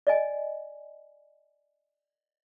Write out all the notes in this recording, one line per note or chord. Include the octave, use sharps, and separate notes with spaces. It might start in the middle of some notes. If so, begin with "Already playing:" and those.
D5 D#5 G#5